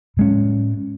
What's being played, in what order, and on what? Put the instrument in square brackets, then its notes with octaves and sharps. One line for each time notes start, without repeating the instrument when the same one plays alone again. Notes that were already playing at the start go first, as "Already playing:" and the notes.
[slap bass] A2 G#3 C#4